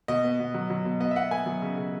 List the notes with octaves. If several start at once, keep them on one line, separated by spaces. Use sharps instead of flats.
B2 D#5
B3
B2
F#3
F#3
B2
B3 D#5
E5
B3 F#5
B3 G#5
F#3
C#3
C#3